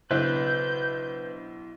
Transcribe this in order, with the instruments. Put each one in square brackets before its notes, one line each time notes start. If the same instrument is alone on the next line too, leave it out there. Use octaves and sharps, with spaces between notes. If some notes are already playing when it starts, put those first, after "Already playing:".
[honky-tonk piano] B1 E4 C5 [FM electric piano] C#3 D4 [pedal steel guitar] B4 F#6 [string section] G6